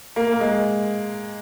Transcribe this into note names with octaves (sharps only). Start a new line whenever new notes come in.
A#3
A#3
G#3